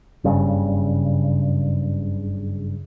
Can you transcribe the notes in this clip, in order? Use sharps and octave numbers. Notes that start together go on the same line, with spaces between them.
F#1 G2 C#3